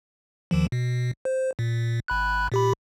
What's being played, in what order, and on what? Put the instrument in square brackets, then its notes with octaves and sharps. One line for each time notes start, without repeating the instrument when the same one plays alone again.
[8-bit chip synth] D#2 D#3 F3
B2
C5
A#2
G#1 B5 F#6
A#2 G4 B5